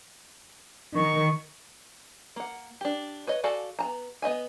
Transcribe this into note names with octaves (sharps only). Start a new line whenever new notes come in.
D#3 C#6
A#3 F#5
D4 G4
B4 C#5 D#5
F#4 A4 D5 F5 G#5
B3 A5 A#5
B3 D#5 E5 G#5